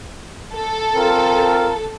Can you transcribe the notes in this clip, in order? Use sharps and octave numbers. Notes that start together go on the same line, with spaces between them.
A4
C4 F4 A#4